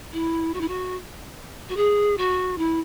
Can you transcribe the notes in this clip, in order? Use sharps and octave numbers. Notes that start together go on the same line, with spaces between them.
E4
F#4
E4
F#4
F#4
G#4
F#4
E4